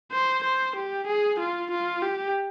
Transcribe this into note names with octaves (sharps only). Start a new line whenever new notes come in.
C5
C5
G4
G#4
F4
F4
G4